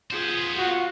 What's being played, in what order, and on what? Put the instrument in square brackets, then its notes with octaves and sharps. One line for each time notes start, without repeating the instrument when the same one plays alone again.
[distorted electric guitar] B3 C5 [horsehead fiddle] F4 G#4
[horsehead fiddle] F4 F5 [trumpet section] F#4